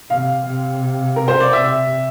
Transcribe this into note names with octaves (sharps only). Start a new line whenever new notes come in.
C3 F5
C3
A#4
C5
D5
C3 E5